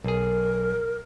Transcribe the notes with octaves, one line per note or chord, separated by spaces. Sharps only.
B1 G#4 A#4